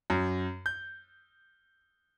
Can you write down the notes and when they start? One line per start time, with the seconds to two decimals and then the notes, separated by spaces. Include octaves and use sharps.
0.10 F#2
0.66 G6